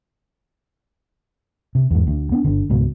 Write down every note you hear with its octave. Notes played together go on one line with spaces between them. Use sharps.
C3
E2 G#2
D2
B3 C4 D4
G1 D3
C#2 G#2 B2